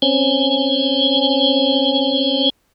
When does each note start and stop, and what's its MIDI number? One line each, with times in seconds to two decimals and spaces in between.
0.02 2.49 60
0.02 2.49 61
0.02 2.49 72
0.02 2.49 73
0.02 2.49 80